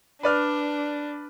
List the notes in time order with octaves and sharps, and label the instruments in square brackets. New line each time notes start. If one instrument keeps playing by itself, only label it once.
[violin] D4 [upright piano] B4 D5 F6